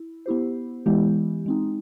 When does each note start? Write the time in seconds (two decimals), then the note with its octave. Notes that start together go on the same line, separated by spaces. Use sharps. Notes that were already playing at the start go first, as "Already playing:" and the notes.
Already playing: E4
0.26 B3 E4 G4 C5
0.86 E3 G#3 B3 E4 G4
1.46 G#3 C4 D#4